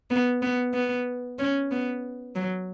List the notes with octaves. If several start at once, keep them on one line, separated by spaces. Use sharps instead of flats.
B3
B3
B3
C#4
B3
F#3